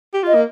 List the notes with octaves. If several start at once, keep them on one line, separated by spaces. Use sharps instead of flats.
G4
F4 D#5
A#3